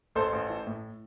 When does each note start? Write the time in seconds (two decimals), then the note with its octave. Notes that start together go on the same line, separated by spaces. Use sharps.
0.15 A1 A4 C5
0.33 A1
0.49 E3
0.67 A2